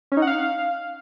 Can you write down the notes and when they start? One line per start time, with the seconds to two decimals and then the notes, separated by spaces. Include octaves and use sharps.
0.12 C#4
0.17 D#4
0.22 F#5
0.27 F5